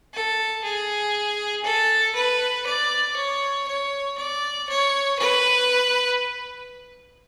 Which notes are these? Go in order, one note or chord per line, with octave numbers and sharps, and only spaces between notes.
A4
G#4
A4
B4
D5
C#5
C#5
D5
C#5
B4